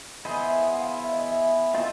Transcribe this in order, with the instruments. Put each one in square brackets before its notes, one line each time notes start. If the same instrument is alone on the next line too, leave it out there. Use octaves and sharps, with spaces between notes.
[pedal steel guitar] B3 E4 G#4 C5 [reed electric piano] D#5
[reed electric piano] E5
F#5
F5
E5
D#5
E5
[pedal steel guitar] C4 F4 A4 [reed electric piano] D#5